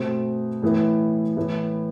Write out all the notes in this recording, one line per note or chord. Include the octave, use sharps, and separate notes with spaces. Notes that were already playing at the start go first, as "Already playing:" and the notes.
Already playing: B2 A3 C4
A2 E3 B3 E4
A2 E3 B3 E4